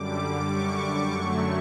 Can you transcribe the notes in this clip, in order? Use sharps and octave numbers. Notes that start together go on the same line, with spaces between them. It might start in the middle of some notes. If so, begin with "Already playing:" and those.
Already playing: F#2 D3 G3 D6
C#6
F#2 D3 F#3 A3